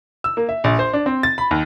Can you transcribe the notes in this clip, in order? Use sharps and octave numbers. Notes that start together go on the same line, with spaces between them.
E6
A#3
E5
A#1
C5
D4
C4
A6
B5
D#2